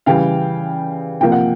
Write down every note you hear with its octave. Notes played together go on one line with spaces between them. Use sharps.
C#3 E3 G3 F5 G5
C3 F3 A#3 G5
F#5